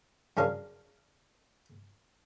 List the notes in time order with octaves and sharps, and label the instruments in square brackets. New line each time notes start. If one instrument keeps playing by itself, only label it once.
[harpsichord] F#2 C#3 D4 A#4 C#5 F5